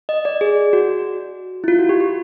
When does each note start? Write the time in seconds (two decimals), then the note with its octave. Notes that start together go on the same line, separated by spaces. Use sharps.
0.09 D#5
0.25 D5
0.41 G#4
0.73 F#4
1.64 E4
1.68 F4
1.79 F#4
1.89 G4
2.00 G4